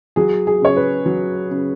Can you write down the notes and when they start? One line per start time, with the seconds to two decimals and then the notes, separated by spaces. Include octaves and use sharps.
0.16 F#3 G#4
0.47 G#4
0.62 C#3 C#5
0.77 B4
1.06 F#3
1.51 C#3